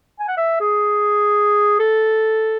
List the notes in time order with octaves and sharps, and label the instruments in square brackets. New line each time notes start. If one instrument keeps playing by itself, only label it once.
[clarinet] G#5
F#5
E5
G#4
A4